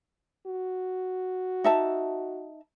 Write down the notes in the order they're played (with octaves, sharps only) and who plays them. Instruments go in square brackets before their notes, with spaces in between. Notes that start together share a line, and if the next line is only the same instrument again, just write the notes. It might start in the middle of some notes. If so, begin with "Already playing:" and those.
[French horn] F#4
[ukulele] D#4 E5 A5